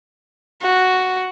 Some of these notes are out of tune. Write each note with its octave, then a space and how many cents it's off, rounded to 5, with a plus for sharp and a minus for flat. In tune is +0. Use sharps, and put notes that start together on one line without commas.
F#4 +0